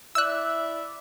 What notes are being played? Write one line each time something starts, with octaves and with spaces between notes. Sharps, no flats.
E4 D5 E5 E6 F#6